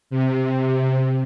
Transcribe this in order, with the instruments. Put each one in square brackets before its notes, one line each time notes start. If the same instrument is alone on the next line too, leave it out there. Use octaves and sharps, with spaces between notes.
[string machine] C3